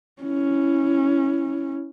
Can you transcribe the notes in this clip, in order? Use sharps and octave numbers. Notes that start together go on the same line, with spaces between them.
C#4 E4